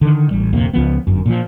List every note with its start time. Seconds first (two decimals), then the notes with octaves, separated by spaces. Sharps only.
0.01 D3 D#3
0.31 A1 G3
0.53 D1 F2 C3 A#3
0.74 C#2 F3 B3
1.07 G1 F#2
1.26 A#2 E3 F3